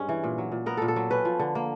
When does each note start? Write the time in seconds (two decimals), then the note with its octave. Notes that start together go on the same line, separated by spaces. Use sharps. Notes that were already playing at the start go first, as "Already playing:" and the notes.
Already playing: G2 G#3 C#4
0.09 E3
0.24 A#2
0.38 F#3
0.52 A#2
0.66 B3 A#4
0.77 A#2 A4
0.88 A4
0.96 F#3
1.11 C#4 B4
1.25 F3
1.39 D3
1.55 A#3